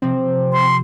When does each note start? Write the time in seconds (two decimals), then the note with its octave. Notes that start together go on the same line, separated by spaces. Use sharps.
0.02 C3 F3 C4
0.52 C6